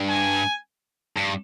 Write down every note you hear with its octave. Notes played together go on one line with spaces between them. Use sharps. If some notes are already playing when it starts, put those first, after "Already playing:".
Already playing: G2
G#5
G2